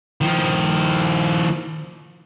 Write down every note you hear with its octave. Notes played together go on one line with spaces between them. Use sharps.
D#3 F3